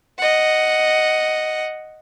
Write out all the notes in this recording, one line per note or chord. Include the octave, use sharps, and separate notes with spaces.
D#5 F#5